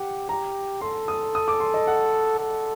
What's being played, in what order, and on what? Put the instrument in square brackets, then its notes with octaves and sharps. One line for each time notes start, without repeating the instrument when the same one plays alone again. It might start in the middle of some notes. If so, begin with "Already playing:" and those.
Already playing: [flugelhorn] G4 [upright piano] F#5
[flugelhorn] G4 [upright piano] A#5
[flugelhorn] A4 [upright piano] C6
[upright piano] D#6
D#6
D6
C6
D#5
F#5
[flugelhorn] A4